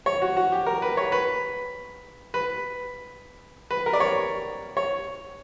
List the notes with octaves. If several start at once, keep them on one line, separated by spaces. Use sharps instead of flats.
C#5
F#4
F#4
G4
A#4
B4
C#5
B4
B4
B4
A#4
D5
C#5
C#5